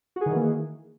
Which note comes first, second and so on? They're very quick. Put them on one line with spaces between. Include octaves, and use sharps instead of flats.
F#4 G#4 D#3 E3 A#3